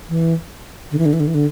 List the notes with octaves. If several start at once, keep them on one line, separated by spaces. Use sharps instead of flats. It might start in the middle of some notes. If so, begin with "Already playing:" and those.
E3
D3
E3
D3
E3
D3
E3
D3